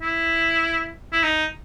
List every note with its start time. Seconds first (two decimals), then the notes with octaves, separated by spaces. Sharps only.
0.02 E4
1.13 E4
1.23 D#4